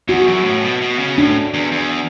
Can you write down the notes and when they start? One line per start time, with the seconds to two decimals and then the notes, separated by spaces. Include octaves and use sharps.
0.08 E2 F#4
0.27 F#2
0.45 A2
0.63 B2
0.81 B2
0.99 C#3
1.18 A2 D4
1.54 E2
1.72 E2